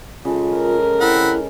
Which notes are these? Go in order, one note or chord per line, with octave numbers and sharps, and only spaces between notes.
C#3 G#3 F4 A4
A#4
C4 E4 F#5 B5